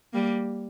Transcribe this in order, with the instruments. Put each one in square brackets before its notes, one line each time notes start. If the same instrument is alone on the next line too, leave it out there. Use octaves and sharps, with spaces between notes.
[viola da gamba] G3 A#3